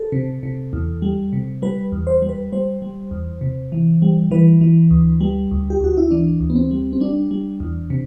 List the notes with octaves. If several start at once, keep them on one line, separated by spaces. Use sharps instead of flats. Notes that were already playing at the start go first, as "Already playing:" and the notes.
Already playing: A4
C3
C3
E2
G3
C3
G3 B4
E2
C5
G3
B4
G3 C5
G3
E2
C3
E3
G3
E3 B4
E3
D2
G3
D2
G4
D2 F#4
E4
E3 D4
D2
B3
C4
G3
C4
G3 D4
G3
E2
C3